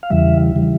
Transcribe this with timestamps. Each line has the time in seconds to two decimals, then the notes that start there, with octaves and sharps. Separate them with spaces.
0.03 F5
0.10 E2 C#3 E3 G3 E5
0.56 C#3 E3 G3